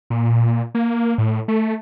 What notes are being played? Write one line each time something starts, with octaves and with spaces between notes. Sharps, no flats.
A#2
A#3
A2
A3